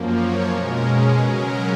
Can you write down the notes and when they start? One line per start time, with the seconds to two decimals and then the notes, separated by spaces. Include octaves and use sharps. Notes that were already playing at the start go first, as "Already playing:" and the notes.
Already playing: F#2 F3 A#3
0.08 C#5
0.46 B2 G#3 C#4 A#4
0.83 G#4
1.20 C#3 F#3 C#4 A#4